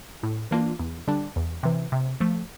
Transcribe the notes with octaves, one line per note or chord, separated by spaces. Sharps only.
A2
E3 A#3 D4 F4
E2
D3 G3 D4
E2
C3 E3
C3
F3 A3